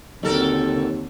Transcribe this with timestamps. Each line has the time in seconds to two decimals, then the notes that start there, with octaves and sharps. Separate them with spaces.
0.23 D#2 D3 F#3 C4 A4 A#4